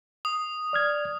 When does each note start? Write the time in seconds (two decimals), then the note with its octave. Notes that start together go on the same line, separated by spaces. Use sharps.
0.25 D#6
0.73 D5 F6 G#6